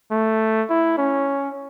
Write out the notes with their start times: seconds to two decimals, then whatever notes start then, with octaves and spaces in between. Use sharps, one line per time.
0.11 A3
0.70 E4
0.98 C#4